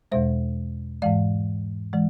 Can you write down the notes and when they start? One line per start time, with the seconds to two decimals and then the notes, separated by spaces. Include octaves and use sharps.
0.12 E2 B2 G#3 C5 E5
1.02 G#2 E3 G#3 D5 F5
1.93 E3 G#3